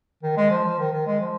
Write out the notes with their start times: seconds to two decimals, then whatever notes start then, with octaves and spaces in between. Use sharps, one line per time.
0.23 D#3
0.37 G#3
0.51 F3
0.65 F3
0.79 D#3
0.92 D#3
1.07 G#3
1.20 F3